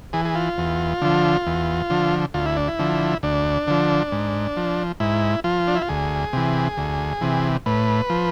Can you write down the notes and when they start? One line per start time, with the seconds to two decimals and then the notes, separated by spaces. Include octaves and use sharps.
0.13 E3 G#4
0.25 G#4
0.35 F4
0.58 E2
1.02 D3 F3
1.47 E2
1.90 D3 F3
2.34 D2 F4
2.46 E4
2.57 D4
2.68 E4
2.79 D3 F3
3.23 D2 D4
3.67 D3 F3
4.12 G#2
4.57 F3
5.00 G#2 E4
5.44 F3 F4
5.68 D4
5.75 E4
5.82 F4
5.89 D2 G#4
6.33 C3 E3
6.78 D2
7.21 C3 E3
7.66 A2 B4
8.10 F3